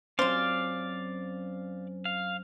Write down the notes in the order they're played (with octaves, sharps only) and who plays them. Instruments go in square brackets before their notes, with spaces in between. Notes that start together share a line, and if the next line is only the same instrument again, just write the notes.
[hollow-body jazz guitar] F#2 C4 C#4 [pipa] F4 C5 [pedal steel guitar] D5 F5
[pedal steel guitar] F5